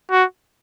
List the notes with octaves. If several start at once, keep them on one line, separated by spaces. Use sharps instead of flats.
F#4